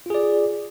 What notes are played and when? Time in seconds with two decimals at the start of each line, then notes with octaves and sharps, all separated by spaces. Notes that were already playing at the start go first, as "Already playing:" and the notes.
0.06 F4
0.10 G#4
0.15 D5